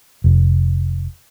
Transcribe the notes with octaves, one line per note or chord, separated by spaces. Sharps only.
F1